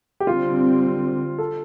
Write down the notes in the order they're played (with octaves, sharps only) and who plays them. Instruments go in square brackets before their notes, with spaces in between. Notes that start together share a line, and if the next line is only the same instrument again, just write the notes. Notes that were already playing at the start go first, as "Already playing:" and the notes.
[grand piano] G4
[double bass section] D3 G3 C4 [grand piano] F4
[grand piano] A4